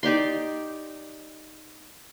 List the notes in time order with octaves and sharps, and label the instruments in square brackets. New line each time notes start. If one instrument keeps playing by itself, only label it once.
[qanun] D#4 G4 D5 C6